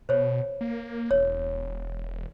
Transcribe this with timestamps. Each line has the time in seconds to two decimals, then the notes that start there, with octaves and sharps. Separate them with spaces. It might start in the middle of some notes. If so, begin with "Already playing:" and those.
0.09 B2 C5 C#5
0.61 A#3
1.11 E1 C#5